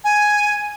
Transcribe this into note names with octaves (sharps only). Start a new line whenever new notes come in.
G#5